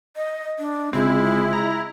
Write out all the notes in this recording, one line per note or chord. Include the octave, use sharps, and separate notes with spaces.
D#5
D4
G1 C#3 G#3 C4 E4 F4
A#5